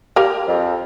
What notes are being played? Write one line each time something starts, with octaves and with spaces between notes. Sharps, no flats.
G4 A#4 F5
F2